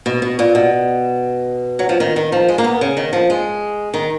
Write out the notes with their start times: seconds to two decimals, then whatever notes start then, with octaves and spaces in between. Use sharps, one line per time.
0.06 B2
0.22 B2
0.39 A#2
0.55 B2
1.79 F#3
1.89 F3
2.00 D#3
2.16 D#3
2.32 F3
2.48 G#3
2.58 A#3
2.64 B3
2.81 C#3
2.97 D#3
3.13 F3
3.30 G#3
3.94 D#3